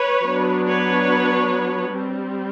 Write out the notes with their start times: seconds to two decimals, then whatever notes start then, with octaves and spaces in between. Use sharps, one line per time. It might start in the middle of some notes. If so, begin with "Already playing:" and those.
Already playing: B4 C#5
0.24 F#3 B3 D4
0.66 B4 C#5
1.94 G3 C4